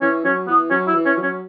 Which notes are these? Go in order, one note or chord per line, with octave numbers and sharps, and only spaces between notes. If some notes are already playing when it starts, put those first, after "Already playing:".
E3 C#4
F#3 C#4
E3 B3
F#3 C#4
E4
E3
C#4
F#3
C#4